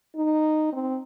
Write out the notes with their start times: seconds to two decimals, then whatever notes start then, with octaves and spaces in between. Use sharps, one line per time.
0.16 D#4
0.72 C4